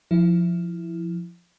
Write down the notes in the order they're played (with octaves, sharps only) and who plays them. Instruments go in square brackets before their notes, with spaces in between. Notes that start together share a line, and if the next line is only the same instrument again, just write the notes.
[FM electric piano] F3 E4